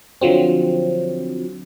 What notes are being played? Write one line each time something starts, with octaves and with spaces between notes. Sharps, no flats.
D3 F3 F#3 C4